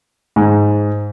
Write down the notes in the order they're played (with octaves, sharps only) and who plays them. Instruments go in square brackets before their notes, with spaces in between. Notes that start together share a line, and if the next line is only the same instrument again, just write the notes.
[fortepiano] G#2